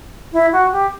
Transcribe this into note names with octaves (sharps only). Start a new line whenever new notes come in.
E4
F#4
G4